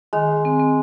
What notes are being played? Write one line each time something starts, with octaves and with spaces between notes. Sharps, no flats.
D#3 G#3
D#3
C4
C4